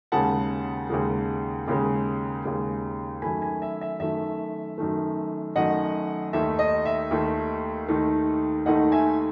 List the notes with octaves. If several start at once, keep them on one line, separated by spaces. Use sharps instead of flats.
D#2 C#3 G#3 F#5 A5
D#2 C#3 G#3
D#2 C#3 G#3
D#2 C#3 G#3
F#2 D#3 A3 G#5 B5
G#5 B5
E5
E5
F#2 D#3 A3 E5
F#2 D#3 A3
F#2 D#3 A3 D#5 F#5
D#2 D#3 A3 D#4 E5
D#5
E5
D#2 D#3 A3 D#4
D#2 D#3 A3 D#4
D#2 D#3 A3 D#4 D#5 F#5
E5 G#5